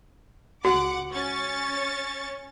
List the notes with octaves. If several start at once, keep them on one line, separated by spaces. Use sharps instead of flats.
C#2 F#4 F#5 D6
C#4 C#6 A6